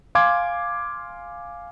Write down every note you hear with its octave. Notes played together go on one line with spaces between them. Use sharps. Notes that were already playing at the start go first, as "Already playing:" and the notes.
F5 G#5 C6 D6 G#6